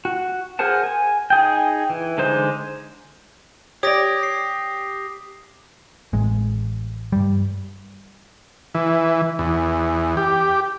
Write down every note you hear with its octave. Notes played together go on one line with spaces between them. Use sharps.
F#4
G#4 A#4 C5 F#5 A5
G#5
D#4 G#4 G5
E3
D3 G#3 D#4 C5 C6
G4 C#5 D5 D#6 A#6
C7
A1 G#3
G2 G3
E3
E2
G4